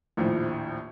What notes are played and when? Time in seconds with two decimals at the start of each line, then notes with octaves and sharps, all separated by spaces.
0.17 A#1 D#2 A2 F3